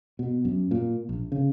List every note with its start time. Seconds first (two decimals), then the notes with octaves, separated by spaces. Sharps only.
0.19 B2
0.45 F#2
0.71 A#2
1.09 A#1
1.32 C#3